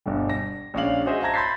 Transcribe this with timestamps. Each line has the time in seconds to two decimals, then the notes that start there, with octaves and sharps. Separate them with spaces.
0.06 G1 B2 D3 G3
0.30 A#6
0.74 A#1 G#3 C#4 D4 F5 F#7
1.06 F#4 G#4 C5 D#5 E5
1.21 E5 F5 A5 A#5 G#6 A#6
1.34 B5 C6 G6 A6 B6 C7